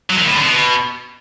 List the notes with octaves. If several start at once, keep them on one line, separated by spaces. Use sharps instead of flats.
F#3
D#3
A2
D3
B2